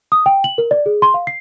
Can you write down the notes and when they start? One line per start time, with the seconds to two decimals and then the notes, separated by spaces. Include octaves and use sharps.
0.12 D#6
0.26 G5
0.44 F#7
0.58 A#4
0.71 D5
0.86 G#4
1.02 C6
1.14 F5
1.27 C7